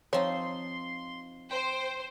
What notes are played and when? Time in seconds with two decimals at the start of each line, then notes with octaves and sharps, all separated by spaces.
0.13 F3 C4 D#4 C#5 C6
1.51 C5 G5